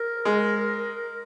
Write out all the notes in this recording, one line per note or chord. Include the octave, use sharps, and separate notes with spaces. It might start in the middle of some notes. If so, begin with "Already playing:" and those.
Already playing: A#4
G#3